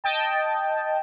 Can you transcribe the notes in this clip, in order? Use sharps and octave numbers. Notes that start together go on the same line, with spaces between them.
D#5 G5 A5